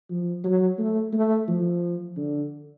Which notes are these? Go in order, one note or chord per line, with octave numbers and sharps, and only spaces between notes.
F3
F#3
A3
A3
F3
D3